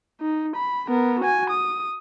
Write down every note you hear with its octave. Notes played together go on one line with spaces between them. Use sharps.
D#4
B5
B3 A#4
F#4 G#5
D#6